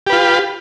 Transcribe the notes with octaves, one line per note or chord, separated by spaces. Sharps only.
F4 G4 B4